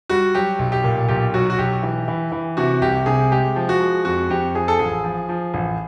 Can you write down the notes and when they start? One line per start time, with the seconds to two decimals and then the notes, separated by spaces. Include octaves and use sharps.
0.10 G3 F#4
0.35 F#3 G4
0.59 B1
0.72 G4
0.84 A#2
1.08 B1 G4
1.34 F#3 F#4
1.50 F#4
1.58 B1 G4
1.83 E3
2.08 E3
2.32 E3
2.57 C3 F#4
2.81 C2 G4
3.06 C3 G#4
3.32 G#3 G4
3.56 F3
3.69 F#4
3.81 G#3
4.05 F2 F#4
4.30 F2 G4
4.55 F3 G#4
4.68 A4
4.79 A1 G#4
5.04 F3
5.29 F3
5.54 A1